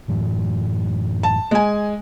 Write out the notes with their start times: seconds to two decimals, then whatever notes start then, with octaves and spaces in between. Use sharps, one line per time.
0.08 F#2 A2 E3
1.23 A5
1.51 G#3 G#5